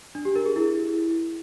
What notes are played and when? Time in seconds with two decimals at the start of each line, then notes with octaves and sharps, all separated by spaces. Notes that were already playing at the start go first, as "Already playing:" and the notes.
0.15 D4
0.25 G4
0.35 A#4
0.46 G#4
0.56 E4